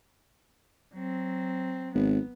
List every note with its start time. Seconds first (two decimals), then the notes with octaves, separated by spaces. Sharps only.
0.94 F#3 C4
1.95 G#1 B3